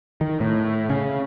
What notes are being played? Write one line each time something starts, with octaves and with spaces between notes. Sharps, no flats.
D#3
A2
C#3